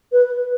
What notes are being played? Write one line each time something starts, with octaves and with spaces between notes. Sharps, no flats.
B4